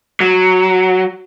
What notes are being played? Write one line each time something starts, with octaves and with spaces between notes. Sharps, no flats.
F#3